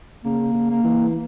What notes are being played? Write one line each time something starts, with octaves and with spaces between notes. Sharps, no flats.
C#3 A#3
C#3
A#3
E3
A#3